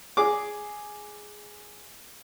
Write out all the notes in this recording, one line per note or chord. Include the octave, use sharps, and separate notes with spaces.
G#4 D6